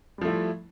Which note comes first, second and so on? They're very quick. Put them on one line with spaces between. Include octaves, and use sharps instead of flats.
G3 F3 A3 E4